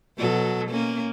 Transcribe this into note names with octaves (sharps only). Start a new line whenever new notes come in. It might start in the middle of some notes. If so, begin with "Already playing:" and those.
B2 F#3 A4
A#3 C#4